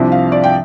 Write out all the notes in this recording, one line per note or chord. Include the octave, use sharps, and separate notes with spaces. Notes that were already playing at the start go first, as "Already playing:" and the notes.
Already playing: C2 C3 F3 D4
F5
D5
G5